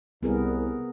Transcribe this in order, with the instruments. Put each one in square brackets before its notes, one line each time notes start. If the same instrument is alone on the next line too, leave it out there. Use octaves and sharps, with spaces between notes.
[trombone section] C2 [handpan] B3 G#4 A#4